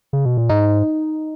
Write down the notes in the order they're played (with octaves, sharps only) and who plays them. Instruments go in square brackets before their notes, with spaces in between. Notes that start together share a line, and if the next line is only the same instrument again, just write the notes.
[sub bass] C#3
B2
A#2
[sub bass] G#2 [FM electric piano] D#4